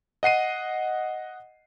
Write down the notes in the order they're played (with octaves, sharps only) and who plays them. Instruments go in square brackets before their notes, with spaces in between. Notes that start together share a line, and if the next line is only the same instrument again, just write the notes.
[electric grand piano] D#5 F#5 C7 D#7